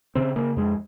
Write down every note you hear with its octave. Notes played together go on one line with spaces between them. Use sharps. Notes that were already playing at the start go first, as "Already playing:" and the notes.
C#3 C4
C#3 A#3
F2 G#3